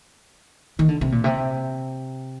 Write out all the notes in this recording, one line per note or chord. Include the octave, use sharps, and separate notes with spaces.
D#3
D3
C3
A#2
C3